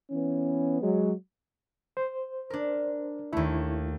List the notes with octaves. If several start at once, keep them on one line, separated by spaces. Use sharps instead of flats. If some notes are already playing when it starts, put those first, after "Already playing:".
E3 B3 C#4
F#3 G#3
C5
D4 A#4
D#2 A3 E4